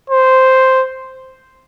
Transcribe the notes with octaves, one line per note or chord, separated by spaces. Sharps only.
C5